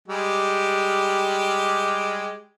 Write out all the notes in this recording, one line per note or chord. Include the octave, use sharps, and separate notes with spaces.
G3 G#3 G4